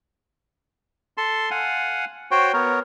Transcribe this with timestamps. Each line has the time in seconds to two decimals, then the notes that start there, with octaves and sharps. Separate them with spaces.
1.17 A4 A5 C6
1.51 F5 F#5 G#5
2.31 F#4 C5 C#5 G5
2.54 B3 A#4 C#5